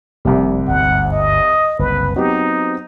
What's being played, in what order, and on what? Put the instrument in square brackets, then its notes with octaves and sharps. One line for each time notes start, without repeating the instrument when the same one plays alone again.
[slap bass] F1 [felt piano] C2 C3 G3
[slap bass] G1 D2 G#2 [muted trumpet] F#5
[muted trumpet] D#5
[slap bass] F#1 C2 [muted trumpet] B4
[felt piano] F#3 B3 G4 [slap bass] C4 [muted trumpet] D#4